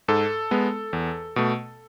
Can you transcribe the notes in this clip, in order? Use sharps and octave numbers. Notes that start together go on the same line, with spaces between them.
G#2 A4
G#3 B3
E2
B2 A3